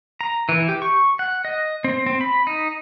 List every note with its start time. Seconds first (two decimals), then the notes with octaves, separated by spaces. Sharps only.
0.21 A#5
0.49 E3
0.69 G4
0.82 C#6
1.19 F#5
1.45 D#5
1.84 C4
2.06 C4
2.21 B5
2.47 D#4